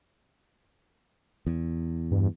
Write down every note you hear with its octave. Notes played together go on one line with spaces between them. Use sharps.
E2
G2